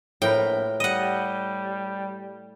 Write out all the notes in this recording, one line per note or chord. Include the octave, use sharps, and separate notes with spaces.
A#1 A2 A#4 B4 G5
G3 D#5 F#5